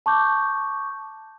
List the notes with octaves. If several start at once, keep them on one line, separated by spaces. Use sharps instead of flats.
A5 C#6 D6 G6